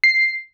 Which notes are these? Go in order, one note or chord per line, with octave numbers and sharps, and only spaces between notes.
C7